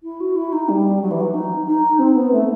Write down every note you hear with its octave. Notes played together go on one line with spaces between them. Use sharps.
E4
F#4
E4
D#4
G3
F#3
E3
F#3
D#4
D#4
C4
B3
A3